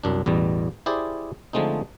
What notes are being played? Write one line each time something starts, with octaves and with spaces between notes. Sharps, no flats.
C2 F#2 D4
A1 E2 B2 G3
E4 G4 G#4 C5 D5
D3 F3 G#3 A3 C4 D#4